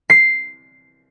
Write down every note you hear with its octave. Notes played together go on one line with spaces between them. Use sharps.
C7